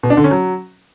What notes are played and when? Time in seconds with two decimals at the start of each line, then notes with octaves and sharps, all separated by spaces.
0.03 B2
0.10 D4
0.17 D3
0.24 C#4
0.31 F#3